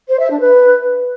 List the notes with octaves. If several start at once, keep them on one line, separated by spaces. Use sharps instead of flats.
C5
E5
D4
B4